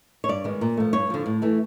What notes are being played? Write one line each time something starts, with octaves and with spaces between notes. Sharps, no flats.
C#5
G2 D5
D#3 G#3 B3
A#2
F3 A3
G2 C#5
D3 F3
A2
E3 A3